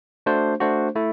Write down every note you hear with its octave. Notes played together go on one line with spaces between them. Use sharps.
A3 D4 F#4 C5
A3 D4 F#4 C5
A3 E4